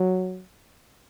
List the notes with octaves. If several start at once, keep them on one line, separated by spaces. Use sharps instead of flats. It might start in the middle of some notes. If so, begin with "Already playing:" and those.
Already playing: F#3